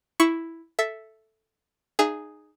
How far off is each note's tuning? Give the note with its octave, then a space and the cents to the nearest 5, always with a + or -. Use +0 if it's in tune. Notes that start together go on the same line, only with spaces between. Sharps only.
E4 +0 C#6 +0
A4 +0 E5 +0
D#4 -25 G#4 +0 F5 -45